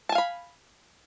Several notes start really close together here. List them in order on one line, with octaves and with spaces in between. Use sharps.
A5 G#5 F5 B5